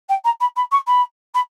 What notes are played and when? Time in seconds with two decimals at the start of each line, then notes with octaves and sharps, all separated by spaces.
0.09 G5
0.24 A#5
0.40 B5
0.56 B5
0.71 C#6
0.86 B5
1.34 B5